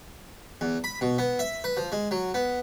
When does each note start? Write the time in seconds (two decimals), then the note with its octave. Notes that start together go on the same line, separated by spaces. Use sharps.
0.61 E2
0.84 B5
1.01 B2
1.18 B3
1.39 E5
1.64 B4
1.77 F3
1.92 G#3
2.11 F#3
2.34 B3